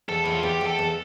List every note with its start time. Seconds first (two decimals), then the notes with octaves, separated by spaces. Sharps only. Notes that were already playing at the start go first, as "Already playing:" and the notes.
0.09 E2 A4
0.24 E2 E4
0.34 F4
0.43 E2 G4
0.61 E2
0.67 A4
0.79 E2